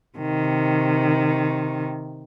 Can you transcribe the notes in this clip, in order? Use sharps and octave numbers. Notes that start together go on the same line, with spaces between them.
C3 D#3